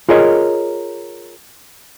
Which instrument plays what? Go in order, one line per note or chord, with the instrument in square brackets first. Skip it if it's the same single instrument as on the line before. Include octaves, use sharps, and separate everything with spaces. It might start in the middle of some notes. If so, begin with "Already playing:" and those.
[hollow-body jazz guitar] F4 G#4 A#4 C#5 D#5